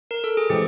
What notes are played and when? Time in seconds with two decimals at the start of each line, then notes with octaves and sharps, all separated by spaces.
0.11 A#4
0.24 A4
0.37 G#4
0.50 E3 G#3 C4 G4